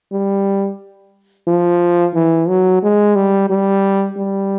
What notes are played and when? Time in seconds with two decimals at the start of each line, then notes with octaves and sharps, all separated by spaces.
0.12 G3
1.47 F3
2.15 E3
2.48 F#3
2.82 G#3
3.16 G3
3.49 G3
4.17 G3